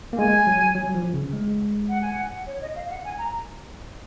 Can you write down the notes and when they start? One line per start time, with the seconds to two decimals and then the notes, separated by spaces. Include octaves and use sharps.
0.13 A#3
0.18 G#3 G#5
0.47 F#3
0.75 F#3
0.95 F3
1.14 C#3
1.33 G#3
1.89 F#5
2.02 G#5
2.13 F#5
2.47 C#5
2.62 D#5
2.76 F5
2.90 F#5
3.04 G#5
3.18 A#5